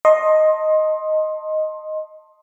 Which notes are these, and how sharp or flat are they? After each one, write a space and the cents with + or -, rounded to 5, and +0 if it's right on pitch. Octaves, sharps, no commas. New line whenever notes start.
D#5 +0 A5 +20 C6 +20